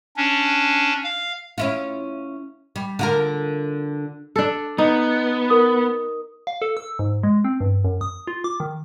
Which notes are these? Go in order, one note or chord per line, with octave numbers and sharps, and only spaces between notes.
C#4 D4
F5
C#4 E4 F4
G3
D3 F4 A#4
D4 A4
B3 D#4
A#4 D#6
F5
A4
E6
G#2
G#3
C4
G2
F#2
D#6
F4
D6
D#3